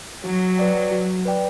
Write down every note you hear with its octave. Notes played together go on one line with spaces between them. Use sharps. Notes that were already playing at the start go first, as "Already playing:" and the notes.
F#3 F#4
B4 D5 G5
F#4
B4 D5 G5